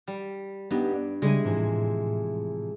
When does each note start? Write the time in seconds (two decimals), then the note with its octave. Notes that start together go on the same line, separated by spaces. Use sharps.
0.08 G3
0.71 G2 B3 D#4 G4
0.93 D5
1.22 C#3 G3 G#3 E4 G#5
1.44 G#2 C3 E3 F3
1.57 A2